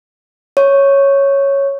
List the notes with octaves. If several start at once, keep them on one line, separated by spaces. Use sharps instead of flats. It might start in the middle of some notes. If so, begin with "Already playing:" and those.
C#5